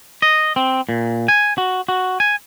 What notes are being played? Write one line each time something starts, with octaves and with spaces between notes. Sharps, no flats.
D#5
C4
A#2
G#5
F#4
F#4
G#5